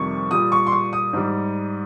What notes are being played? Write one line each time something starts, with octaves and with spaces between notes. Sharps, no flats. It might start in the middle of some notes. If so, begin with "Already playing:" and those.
Already playing: F2 C3 D#3 G3 C#6
A#2 G3 D#6
C#6
C6
C#6
D#6
G#2 G3